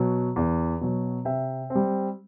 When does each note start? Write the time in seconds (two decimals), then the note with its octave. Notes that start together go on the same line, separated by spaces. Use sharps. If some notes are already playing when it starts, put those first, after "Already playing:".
Already playing: B2 F#3
0.36 E2
0.81 B2 F#3
1.25 C3 E5 G5
1.70 C4
1.75 G3